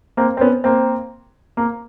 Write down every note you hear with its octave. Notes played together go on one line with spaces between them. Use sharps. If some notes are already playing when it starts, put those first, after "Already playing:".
A#3 C4
C4
B3 C#4
A#3 C4
A#3